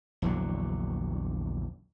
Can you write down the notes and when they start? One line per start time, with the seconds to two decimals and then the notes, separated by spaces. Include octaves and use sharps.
0.22 A#1 E2 D3 F#3